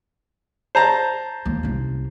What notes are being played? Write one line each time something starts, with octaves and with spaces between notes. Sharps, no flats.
C5 A5 A#5
D#2
C2 C#4